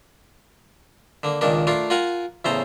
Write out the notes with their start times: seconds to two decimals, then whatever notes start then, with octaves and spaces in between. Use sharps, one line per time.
1.23 D3 A#3
1.41 C#2 A#2 D#3 D4 A#4
1.67 A3 D4 F4 A#4 F5
1.90 F4 A#4 F#5 G#5 A#5
2.45 E2 A2 C#3 A4 C5 A#5